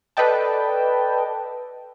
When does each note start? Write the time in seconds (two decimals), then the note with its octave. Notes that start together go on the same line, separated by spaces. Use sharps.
0.17 A4 B4 D5 D#5 G5 A5